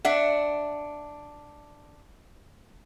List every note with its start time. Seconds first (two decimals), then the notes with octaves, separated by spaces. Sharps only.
0.05 D4 E5 F#5